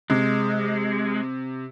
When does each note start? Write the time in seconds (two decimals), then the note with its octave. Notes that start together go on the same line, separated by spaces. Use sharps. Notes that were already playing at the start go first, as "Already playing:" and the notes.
0.10 C3 G#3